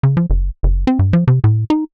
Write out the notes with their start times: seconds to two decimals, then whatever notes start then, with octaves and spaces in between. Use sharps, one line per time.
0.03 C#3
0.17 F3
0.30 F#1
0.63 F#1
0.87 C4
0.99 G2
1.13 F3
1.27 C3
1.44 A2
1.70 D#4